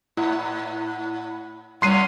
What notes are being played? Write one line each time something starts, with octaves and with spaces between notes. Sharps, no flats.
A2 E4 F#5 B5
A2 G3 C#4 F#5 C6 C7 D#7